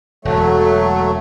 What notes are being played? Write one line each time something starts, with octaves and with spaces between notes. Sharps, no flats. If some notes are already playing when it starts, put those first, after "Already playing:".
E1 F#3 A3